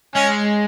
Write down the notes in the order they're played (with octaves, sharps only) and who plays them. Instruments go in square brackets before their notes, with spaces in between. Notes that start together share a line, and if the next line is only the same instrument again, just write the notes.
[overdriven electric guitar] G#3 [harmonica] C#4